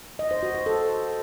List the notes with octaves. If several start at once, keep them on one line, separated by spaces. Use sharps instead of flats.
D#5
C5
F#4
C5
A4